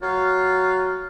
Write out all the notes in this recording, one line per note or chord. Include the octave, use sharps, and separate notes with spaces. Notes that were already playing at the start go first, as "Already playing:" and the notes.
F#3 F4